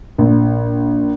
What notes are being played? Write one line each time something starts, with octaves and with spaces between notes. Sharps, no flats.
A#1